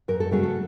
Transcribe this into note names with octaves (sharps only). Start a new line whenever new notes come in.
F#2 A#4
A4
C#3 F#3 A3 C#4 G#4
A4